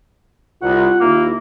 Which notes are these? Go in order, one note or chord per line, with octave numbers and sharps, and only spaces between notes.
C2 F4 F#5
D#2 A#3 E4